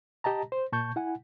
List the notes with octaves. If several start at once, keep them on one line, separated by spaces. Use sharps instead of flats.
G4 D#5 A5 A#5
C5
A#2 A5 C#6 G6
E4 F#5 G#5